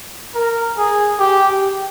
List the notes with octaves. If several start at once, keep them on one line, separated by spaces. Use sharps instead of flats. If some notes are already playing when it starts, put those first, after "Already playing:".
A#4
G#4
G4